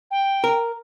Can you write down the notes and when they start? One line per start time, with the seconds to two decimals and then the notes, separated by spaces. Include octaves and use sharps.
0.11 G5
0.44 A#4